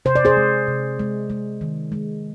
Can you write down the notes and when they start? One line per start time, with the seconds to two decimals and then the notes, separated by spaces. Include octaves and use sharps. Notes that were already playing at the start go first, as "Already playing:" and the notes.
0.05 C3 C5
0.15 D5
0.25 G#4 C5
0.37 G#3
0.67 C3
0.99 G#3
1.30 G#3
1.61 D#3
1.92 G#3